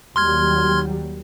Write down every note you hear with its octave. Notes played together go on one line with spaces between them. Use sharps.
D#2 F#3 G3 C6 F6 G#6